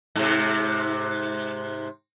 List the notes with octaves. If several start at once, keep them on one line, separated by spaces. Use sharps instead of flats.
G#2 C3